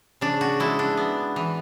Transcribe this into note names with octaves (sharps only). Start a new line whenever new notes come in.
C#3 D4
F#4
G#3 E4
D4
B3
E3